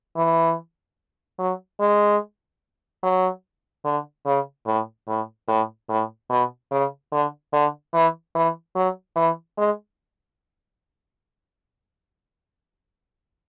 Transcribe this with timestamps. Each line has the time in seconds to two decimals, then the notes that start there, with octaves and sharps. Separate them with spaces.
0.17 E3
1.39 F#3
1.80 G#3
3.03 F#3
3.85 D3
4.26 C#3
4.66 A2
5.08 A2
5.48 A2
5.89 A2
6.30 B2
6.71 C#3
7.12 D3
7.53 D3
7.94 E3
8.35 E3
8.75 F#3
9.16 E3
9.58 G#3